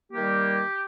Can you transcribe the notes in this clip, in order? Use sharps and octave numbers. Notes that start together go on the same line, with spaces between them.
D#3 G3 A#3 G4